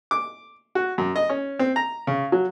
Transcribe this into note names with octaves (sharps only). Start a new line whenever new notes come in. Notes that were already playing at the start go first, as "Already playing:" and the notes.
D6
F#4
F#2
D#5
C#4
C4
A#5
C#3
F#3